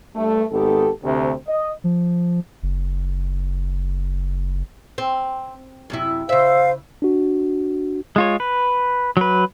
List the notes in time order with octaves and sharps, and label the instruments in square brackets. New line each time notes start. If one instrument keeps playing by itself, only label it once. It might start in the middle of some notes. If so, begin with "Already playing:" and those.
[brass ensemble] G2 A3
G#1 D#3 B3 G4 A4
D2 C3
D#5
[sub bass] F3
F#1
[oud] C4
F#2 C3 E4
[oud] C#3 E5 [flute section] C5 F5
[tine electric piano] D4 F#4
[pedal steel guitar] G#3 F4 C#5
B4
F#3 B4